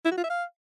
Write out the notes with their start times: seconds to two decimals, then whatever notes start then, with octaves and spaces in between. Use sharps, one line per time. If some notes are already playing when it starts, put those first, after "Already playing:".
0.05 E4
0.11 F#4
0.18 F4
0.24 E5
0.30 F5